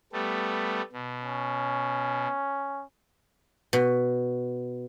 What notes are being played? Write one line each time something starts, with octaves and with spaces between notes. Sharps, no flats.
G3 A3 B3
B2
C#4
B2